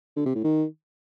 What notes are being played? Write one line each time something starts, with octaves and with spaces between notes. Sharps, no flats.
D3
C3
A2
D#3